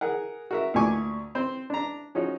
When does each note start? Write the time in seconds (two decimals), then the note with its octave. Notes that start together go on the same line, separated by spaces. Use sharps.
0.01 G#4 A#4 F#5
0.51 F#4 A#4 E5
0.74 D2 A#2 F#4 G#5 C#6 D6
1.35 C4 C5
1.70 D4 A#5
2.15 F3 C#4 D#4 F#4